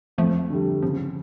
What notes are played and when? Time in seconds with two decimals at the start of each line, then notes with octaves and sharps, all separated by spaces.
0.18 F2 F3 A3
0.50 D3 G3
0.82 C#3 F3